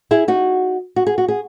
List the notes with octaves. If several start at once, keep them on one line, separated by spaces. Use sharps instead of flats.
E4 G#4
D#4 F#4
F#4
G#4
F#4
G#4